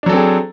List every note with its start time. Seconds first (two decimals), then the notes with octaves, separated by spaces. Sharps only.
0.03 D4
0.06 F#3
0.09 A4
0.13 C4
0.16 G#4